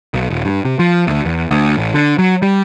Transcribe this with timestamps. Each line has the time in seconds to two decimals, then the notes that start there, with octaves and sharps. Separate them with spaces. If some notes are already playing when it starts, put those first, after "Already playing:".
0.14 B1
0.30 D#1
0.45 G2
0.65 C3
0.79 F3
1.07 D2
1.25 E2
1.51 D2
1.77 A1
1.94 D3
2.18 F#3
2.42 G3